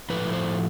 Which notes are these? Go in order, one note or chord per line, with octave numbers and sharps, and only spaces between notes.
A2 F3 A3 B4
C5